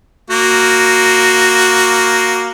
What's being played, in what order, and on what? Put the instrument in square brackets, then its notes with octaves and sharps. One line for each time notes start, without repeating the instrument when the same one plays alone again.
[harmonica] A#3 F#4